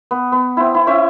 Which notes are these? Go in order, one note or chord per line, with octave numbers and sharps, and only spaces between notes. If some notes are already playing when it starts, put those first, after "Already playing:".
B3
B3
C4 E4
E4
C4 C#4 E4 E5